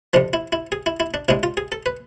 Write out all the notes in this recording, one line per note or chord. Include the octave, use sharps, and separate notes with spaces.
F2 C3 F3 D4
E4
E4
G#4
E4
E4
D4
C3 G#3 D4 E4
F4
G#4
A4
B4